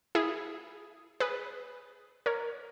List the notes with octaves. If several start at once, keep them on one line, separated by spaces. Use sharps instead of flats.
E4 G#4
G#4 B4
A#4 C#5